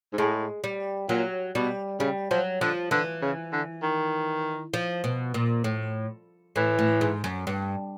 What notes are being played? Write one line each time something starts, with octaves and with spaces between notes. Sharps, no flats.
G#2
A2 G#3
G3
A#2 F#3
B2 G3
C#3 G3
F3 F#3
D3 F3
D3 E3
C#3
D3
D#3
F3
B2
A#2
A2
A2 E3
A2
G#2
F#2
G2